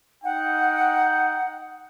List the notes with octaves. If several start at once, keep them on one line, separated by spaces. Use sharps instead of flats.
D#4 F#5 G5